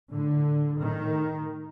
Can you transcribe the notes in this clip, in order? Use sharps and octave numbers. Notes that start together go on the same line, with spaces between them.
A2 D3
A2 D#3